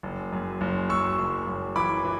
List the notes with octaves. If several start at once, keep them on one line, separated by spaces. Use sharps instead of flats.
F#1
F#2
F#1
F#2 C#6 E6
F#1
F#1
E3 B5 D6
E3